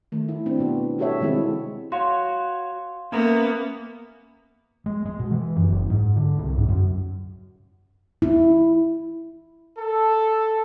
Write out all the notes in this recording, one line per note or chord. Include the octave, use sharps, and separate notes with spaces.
D#3 A3
E4
C4 D4
B2 B3 F#4
G3 F#4 G4 A4 C#5 E5
C3 D#3 G#3 C4 E4
F#4 C#5 F5 C6
A#3 B3 C#4 E5 A#5
G#3
G#3
B2
E3
F#2
F#1
G#2
D3
C2
G#2
F#2
E4
A4